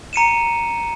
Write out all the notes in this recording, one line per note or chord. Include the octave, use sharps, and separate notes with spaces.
A#5 C#7 D#7 E7